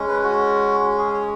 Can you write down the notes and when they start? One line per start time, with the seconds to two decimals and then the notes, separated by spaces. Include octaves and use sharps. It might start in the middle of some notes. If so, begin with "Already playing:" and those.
Already playing: G#3 C#4
0.08 B4
0.24 F#4
0.98 G#4
1.14 C#5